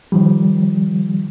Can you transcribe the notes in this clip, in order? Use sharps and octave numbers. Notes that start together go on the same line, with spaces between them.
D#3 F3 G3